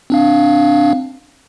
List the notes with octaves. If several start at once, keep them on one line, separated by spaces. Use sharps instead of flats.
C4 D4 F5